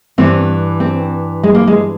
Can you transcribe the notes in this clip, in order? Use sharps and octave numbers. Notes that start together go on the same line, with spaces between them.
G2 E3 C4
C4
G#3
A#3
G#3